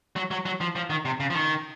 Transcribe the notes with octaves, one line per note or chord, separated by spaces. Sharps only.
F#3
F#3
F#3
F3
F3
D#3
C3
C#3
F3
D#3